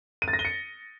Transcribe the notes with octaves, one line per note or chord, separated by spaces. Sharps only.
D#7
A6
A#6
G7
C#7